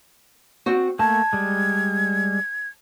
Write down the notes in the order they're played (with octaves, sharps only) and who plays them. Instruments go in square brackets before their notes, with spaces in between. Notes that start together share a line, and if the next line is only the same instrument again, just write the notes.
[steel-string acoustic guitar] C4 F#4
[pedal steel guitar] A3 A#3 [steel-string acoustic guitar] A5 [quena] G#6
[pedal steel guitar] G3 G#3